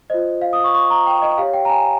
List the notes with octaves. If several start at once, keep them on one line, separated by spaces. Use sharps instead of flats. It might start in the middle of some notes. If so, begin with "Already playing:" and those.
F4 C5 D#5
F5
D#6
C#6
C#6
A#5
G5
D#5
G4 C#5 F5
G5
A#5
G#5